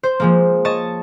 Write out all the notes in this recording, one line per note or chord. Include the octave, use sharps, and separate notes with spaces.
C5
F3 G#3 A#3
C#5 D#5 A5 C#6 A6